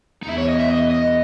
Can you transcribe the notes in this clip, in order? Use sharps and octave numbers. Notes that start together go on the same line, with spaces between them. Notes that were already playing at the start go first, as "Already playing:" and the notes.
D#4
E2 E4
C#5
D#5
E5
D#5
D#5